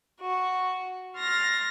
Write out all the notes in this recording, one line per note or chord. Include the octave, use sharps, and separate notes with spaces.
F#4
C6 F6 A6 A#6